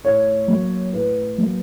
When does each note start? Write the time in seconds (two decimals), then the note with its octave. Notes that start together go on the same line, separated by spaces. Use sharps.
0.03 A2 C#5
0.48 F#3 A#3
0.93 A2 B4
1.38 F#3 A#3